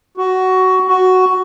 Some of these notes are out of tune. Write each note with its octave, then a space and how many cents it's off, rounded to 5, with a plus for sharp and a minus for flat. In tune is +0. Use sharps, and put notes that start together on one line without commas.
F#4 +15
F#4 +5